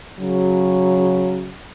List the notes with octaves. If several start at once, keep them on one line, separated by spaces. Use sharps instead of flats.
C#3 F#3